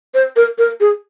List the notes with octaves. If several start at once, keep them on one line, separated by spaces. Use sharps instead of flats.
C5
A#4
A#4
G#4